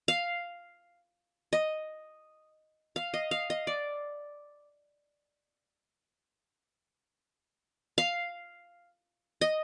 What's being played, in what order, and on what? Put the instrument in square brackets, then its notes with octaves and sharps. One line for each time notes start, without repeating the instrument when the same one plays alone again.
[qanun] F5
D#5
F5
D#5
F5
D#5
D5
F5
D#5